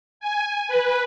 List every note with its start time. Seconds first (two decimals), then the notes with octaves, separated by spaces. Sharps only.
0.20 G#5
0.68 B4